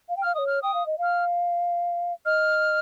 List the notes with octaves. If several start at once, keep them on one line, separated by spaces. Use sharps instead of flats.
F5
G5
F5 F6
C#5 D#5 D#6
F6
G5 D#6
F5
D#5
F5 F6
D#5 F6